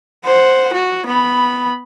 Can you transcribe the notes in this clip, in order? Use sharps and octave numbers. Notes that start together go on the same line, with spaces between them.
C5 F#5
F#4
B3 B5